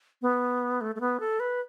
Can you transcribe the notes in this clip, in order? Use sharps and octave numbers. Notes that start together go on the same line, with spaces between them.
B3
A3
A3
B3
A4
B4